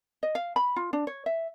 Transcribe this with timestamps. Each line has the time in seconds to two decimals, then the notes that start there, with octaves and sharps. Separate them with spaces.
0.23 D#5
0.35 F5
0.56 B5
0.76 F4
0.93 D4
1.07 C#5
1.26 E5